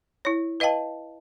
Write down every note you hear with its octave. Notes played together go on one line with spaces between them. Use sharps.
E4 C#5
B4 D#5 F5 G5 A5